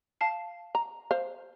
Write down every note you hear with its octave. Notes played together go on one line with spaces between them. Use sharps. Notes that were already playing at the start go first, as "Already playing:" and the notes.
F5 A5 C7
A#5
C5 F5